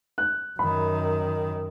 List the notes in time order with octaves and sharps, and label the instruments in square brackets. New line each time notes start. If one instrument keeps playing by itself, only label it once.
[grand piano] F#6
[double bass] F#2 D#3 [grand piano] B5